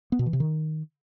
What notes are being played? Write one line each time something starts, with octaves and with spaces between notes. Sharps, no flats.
B3
B2
E3
C3
D#3